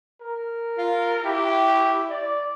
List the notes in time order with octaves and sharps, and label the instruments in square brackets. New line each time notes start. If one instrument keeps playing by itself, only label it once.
[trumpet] A#4
[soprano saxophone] F4
[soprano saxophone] E4 [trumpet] G4
[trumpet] D5